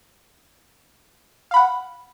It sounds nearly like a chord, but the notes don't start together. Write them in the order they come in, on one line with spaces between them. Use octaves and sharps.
F5 B5 F#5